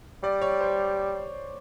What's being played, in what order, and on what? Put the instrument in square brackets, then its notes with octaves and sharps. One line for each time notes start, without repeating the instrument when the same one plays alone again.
[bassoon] G3 [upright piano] D5
[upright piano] C#5
C5